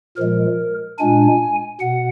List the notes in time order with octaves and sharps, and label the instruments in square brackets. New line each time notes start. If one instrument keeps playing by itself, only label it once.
[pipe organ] A#2 F3 G#3 A#4
A#2 G#3 D4 G#5
B2 F#5